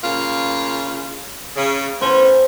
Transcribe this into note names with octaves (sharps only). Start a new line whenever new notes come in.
C#3 A#3 F4
C#3
A2 B3 C#4 C5